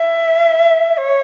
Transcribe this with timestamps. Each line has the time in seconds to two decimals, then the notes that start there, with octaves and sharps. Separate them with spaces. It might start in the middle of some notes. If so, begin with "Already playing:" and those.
Already playing: E5
0.97 C#5